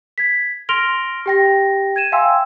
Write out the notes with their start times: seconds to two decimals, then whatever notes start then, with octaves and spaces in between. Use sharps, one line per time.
0.18 G#6 B6
0.69 C6 F6 A#6 D7 F7 G7
1.26 G4 G5 A#6
1.96 G#6 D#7 E7
2.12 E5 F5 G5 G#5 C6 E6